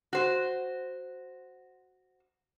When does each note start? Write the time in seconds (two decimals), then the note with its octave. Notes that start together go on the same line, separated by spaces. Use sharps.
0.13 F#4 C5